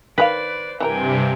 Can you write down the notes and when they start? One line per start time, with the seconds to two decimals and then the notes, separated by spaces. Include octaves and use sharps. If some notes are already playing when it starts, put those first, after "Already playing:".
0.18 D#3 G#4 B4 C5 D5 F5
0.80 G2 C3 E3 E4 A#4 G5 G#5